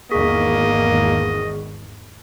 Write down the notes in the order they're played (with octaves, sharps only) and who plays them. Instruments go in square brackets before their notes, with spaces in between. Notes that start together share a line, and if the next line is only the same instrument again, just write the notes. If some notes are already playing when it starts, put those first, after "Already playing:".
[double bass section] G#1 E2 D#3 [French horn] A#3 [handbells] G#4 C#6 B6 [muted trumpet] D#5